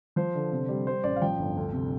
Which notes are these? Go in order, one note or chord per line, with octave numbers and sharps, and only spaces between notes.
F3 C5
D3
C3
G3
G3 C5
A1 D5
F5
F3 G5
G1
D2
C3